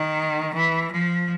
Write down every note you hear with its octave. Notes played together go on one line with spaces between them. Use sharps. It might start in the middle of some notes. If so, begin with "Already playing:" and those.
Already playing: D#3
E3
F3